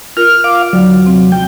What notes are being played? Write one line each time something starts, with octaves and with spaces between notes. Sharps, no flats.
F4 A#4 F6
F5 D6
D#2 D3 F#3
C3 C4
G5